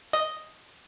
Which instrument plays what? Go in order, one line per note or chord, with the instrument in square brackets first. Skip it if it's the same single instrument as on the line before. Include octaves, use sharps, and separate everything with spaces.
[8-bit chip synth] D#5